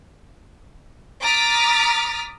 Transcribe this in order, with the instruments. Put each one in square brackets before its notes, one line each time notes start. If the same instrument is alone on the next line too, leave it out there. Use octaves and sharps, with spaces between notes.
[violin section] A#5 D6 D#6 F6 A6 B6